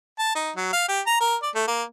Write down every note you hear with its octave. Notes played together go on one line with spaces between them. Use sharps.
A5
D#4
F#3
F5
G4
A#5
A#4
D5
A3
A#3